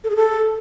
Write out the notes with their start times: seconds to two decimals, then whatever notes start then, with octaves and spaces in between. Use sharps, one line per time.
0.04 A4
0.10 G#4
0.16 A4